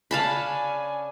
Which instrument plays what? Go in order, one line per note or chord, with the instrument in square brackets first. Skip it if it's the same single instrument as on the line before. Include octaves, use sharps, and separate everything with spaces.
[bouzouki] C#3 C#4 D4 [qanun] F5 A5 B5 [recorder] G#5